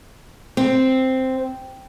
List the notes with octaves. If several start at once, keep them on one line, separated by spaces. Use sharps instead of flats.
C4